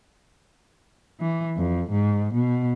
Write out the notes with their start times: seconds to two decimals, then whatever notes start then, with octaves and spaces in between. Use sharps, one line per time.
1.21 E3
1.57 F2
1.91 G#2
2.34 B2